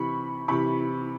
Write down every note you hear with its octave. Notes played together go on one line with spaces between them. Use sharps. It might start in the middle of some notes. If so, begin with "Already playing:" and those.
Already playing: C3 E3 B5 C#6
C3 E3 B5 C#6